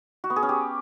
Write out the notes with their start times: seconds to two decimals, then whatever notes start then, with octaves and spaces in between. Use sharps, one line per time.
0.24 F#4
0.30 B3
0.36 G#4
0.43 C#4
0.49 G4